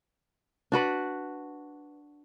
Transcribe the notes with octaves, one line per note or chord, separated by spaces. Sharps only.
D4 F#4 B4 D5